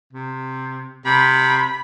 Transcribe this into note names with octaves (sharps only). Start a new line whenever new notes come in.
C3
C3 B5